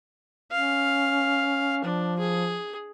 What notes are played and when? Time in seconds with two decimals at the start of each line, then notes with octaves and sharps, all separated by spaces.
0.52 C#4 F5
1.84 F3 D4
2.19 G#4